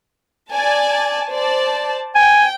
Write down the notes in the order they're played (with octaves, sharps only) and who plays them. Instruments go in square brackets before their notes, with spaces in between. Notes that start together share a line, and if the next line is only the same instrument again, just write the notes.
[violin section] D5 G#5 A5
C5 D5 A5
[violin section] G5 [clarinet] G#5